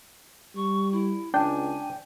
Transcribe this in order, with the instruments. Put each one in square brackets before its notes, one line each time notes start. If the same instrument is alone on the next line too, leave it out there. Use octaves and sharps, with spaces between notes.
[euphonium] G3 [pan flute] C#6
[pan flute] E4
[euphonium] C#2 [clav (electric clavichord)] D4 [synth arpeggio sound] G5 [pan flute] G#5